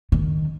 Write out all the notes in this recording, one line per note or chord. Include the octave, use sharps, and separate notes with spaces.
D#3